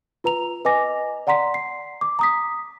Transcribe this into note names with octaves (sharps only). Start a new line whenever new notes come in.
F4 B4 A#5 F7
B4 D#5 G#5 D6 A#6
D5 F#5 A#5 C6 B6
C7
D6
A#5 D#6 B6